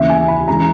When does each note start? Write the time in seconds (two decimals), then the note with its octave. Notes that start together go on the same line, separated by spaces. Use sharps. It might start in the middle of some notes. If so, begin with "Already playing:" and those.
Already playing: D#2 C#3 E3 E5
0.10 G#5
0.28 B5
0.48 C#3 E3 G#3 A#5